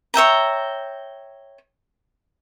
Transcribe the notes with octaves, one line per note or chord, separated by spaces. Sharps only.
C#5 E5 G5 A#5